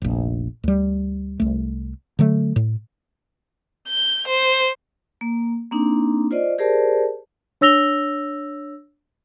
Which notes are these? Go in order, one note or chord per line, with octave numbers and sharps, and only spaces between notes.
F1 A#1
D2 G3
C2 A3
D3 F#3 A3
A2
G6
C5
A#3
A#3 C4 D4 D#4
F4 C5 D5 D#5
G4 G#4 A#4 C5 D5 A5
D4 C#5 E6 A#6 F7 G7